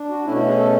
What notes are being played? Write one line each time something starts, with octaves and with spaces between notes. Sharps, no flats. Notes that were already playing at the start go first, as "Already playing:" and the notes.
Already playing: D4
F#4
B2 A3 C#4 E4
F#4
G#4
A4